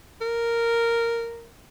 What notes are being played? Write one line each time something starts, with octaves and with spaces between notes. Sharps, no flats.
A#4